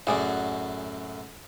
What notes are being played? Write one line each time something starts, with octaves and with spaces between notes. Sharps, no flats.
F#2 A2 F#4 G#4 D5